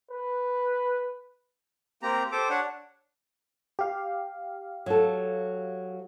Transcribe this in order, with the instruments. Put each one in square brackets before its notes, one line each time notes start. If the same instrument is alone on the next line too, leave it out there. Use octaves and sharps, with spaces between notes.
[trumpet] B4
[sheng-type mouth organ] A#3 C4 G4 A#5
G4 A4 C5 D6
D4 C#5 F#5
[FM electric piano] G4 F5
[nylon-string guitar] F#3 A4